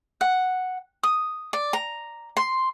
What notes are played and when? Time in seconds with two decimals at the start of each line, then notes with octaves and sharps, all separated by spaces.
0.21 F#5
1.03 D#6
1.53 D5
1.73 A#5
2.37 C6